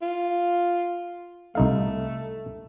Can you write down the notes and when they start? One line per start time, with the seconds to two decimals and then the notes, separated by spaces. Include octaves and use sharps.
0.02 F4
1.55 C2 A3 D#4 F5